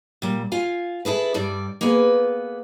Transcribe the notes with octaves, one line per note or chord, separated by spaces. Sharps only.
A#2 G3
F4 F5 G#5
E4 G#4 A4 B4
G2 G3 D5
A#3 B3 G#4 B4